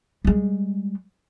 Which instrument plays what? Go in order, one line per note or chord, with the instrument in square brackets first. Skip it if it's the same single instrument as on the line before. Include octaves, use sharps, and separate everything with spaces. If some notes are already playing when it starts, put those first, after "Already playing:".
[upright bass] G3 G#3